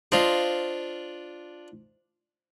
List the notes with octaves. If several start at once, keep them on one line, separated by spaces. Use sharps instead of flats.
D4 F4 C5 D#5 F5